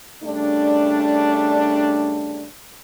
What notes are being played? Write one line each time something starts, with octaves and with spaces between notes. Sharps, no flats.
C#3 G3 A3 D4